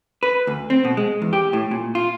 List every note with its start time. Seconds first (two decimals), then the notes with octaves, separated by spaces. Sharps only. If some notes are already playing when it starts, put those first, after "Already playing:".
0.23 B4
0.47 D2
0.70 C4
0.85 B2
0.97 G#3
1.22 E2
1.33 G4
1.53 A2
1.71 A#2
1.95 F4